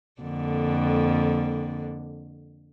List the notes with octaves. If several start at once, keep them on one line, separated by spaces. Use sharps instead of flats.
F2 D3 A#3